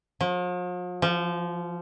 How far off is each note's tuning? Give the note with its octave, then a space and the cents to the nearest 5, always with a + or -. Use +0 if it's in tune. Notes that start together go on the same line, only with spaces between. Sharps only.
F3 +45
F3 -20